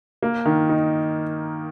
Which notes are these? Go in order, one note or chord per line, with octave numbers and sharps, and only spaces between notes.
A#3
D#3
D#4